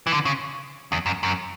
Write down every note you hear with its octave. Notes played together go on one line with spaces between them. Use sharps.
E3
D3
C#3
E2
F#2
F#2